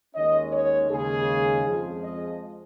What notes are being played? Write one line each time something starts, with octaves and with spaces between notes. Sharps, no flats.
D#2 D#3 G#3 C#4 D#5
C#5
D#2 C#3 G#3 G#4
F2 F3 G#3
D#5